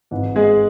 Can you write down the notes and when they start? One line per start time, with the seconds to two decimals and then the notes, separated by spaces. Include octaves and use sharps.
0.11 G#1 G#2 E3
0.36 G#3 G#4